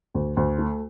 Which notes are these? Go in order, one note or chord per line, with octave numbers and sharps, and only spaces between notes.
D2
D2
A3